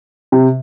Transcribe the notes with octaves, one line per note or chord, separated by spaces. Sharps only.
C3